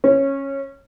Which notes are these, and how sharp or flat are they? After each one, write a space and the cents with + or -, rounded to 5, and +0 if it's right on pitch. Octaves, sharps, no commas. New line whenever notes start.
C#4 -15